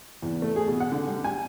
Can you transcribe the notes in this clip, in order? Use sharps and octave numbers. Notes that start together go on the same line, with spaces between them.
E2
A3
G#4
B2
F#5
D3
G3
G#5